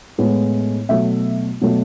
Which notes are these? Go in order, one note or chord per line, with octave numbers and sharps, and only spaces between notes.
A2 G#3 B3
B2 F#3 A3 E5
B2 F#3 A3